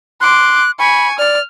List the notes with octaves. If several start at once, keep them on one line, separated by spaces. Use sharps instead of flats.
C6 D6 F#6
G#5 B5 C#6
D5 F6